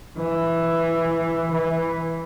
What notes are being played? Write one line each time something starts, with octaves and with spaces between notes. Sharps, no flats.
E3
E3